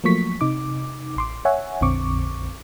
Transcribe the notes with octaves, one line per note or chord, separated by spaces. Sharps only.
F3 F#3 A3 A#3 C#6 B6
C3 D#4 D6
A1 C6 D6
C#5 E5 F#5 G#5
A#1 F2 D3 C4 C#6 D6